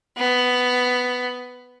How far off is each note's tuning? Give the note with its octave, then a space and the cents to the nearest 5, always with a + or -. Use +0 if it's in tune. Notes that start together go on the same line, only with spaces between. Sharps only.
B3 +10